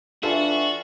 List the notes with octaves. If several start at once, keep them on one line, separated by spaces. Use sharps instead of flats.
E3 D4 F4 F#4 A4 E5